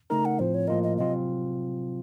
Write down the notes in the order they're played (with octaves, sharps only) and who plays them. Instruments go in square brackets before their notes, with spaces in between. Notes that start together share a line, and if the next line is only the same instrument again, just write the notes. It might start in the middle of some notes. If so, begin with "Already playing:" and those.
[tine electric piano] C#3 A3 D#4 A#4 [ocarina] A#5
[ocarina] F#5
[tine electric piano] A2 F3 C4 F4 [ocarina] C5
[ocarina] C#5
[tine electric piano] A2 F3 A#3 F4 A#4 [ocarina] D#5
[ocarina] D#5
[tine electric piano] C3 F#3 C4 F4 [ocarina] D#5